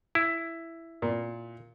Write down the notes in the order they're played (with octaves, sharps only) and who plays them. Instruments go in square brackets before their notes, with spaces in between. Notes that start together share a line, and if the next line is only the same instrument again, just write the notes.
[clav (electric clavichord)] E4
[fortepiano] A#2